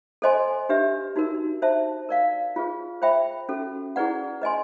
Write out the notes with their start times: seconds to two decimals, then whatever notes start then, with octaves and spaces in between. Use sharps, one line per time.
0.22 A4 C5 D#5 G#5 C6
0.69 D4 G4 B4 E5
1.16 D#4 F#4 A#4
1.62 C5 E5 A5
2.09 A#4 D5 F5
2.56 F4 G#4 B4
3.02 C5 E5 G5 B5
3.48 C#4 F#4 A4
3.96 E4 G#4 B4 D5 F#5
4.42 B4 D#5 G#5 C6